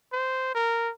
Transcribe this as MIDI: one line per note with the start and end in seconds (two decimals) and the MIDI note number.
0.12 0.52 72
0.55 0.91 70